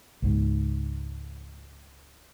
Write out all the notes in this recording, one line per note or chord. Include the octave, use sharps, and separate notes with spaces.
C#2 G#2